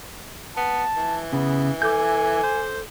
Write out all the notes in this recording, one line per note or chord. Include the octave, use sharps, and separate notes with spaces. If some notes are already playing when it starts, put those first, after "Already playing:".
B3 A5
E3
C#3 B3
A4 G#5 D6 G6
C5